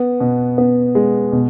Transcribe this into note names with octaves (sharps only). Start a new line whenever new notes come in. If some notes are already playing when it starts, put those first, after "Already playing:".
Already playing: B3
B2
B3
G#3
B2